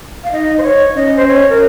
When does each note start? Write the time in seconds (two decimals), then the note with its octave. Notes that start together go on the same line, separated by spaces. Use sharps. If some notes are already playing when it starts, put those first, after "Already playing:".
0.24 F5
0.32 D#4 D#5
0.58 C5
0.63 C#5
0.95 C#4 D#5
1.17 C5
1.27 C#5
1.50 A#4